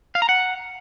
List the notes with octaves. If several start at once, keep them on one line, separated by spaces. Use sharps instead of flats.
F5
A#5
F#5